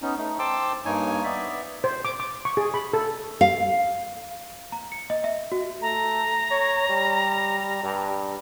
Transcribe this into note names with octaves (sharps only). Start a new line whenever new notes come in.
B3 C#4 D#4
A3 D#4
C5 G5 A5 C6 D6 E6
G2 A#3 D#4 C#5 G#5
B3 D5 E5
C5
D6
D6
C#6
G#4
B5
A4
F5
A#5
C#7
D#5
E5
F#4
A3 A#5
C#5
G3
G2